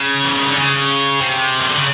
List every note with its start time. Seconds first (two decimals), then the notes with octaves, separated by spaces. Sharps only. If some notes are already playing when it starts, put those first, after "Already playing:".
Already playing: C#3
0.24 E3
0.34 D#3
0.46 D3
0.56 C#3
1.21 C3
1.60 D#3
1.68 D3
1.77 C#3